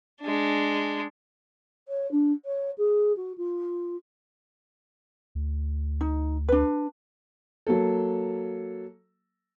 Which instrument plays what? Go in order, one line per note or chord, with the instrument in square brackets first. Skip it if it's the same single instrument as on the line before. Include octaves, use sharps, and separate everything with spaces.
[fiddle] G#3 D4
[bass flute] C#5
D4
C#5
G#4
F#4
F4
[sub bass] D2
[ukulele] D#4
D4 B4
[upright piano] F#3 A#3 A4